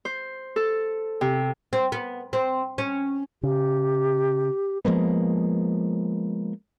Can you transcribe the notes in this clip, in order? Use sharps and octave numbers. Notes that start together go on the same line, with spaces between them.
C5
A4
C3
C4
B3
C4
C#4
C#3 G4
F3 G#3 A#3 B3